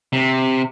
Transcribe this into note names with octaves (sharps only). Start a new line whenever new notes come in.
C3